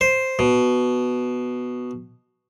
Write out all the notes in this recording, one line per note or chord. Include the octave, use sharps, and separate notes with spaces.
C5
B2